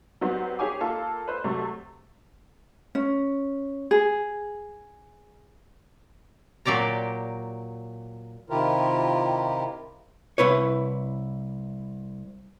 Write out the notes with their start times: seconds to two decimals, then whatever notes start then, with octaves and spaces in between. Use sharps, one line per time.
0.21 F#3 G3 B3 C4
0.59 G4 G#4 C#5 G#5 D6
0.81 A#3 F4 A4
1.27 B4 C5
1.44 C3 F#3 A3
2.95 C#4
3.91 G#4
6.65 A#2 F#3 G4 D5 A#5
8.50 C3 D#3 E4 F4 G4 A#4
10.38 C2 E4 B4 C#5